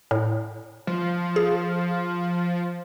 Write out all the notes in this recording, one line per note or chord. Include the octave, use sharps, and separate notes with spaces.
A2
F3
G#4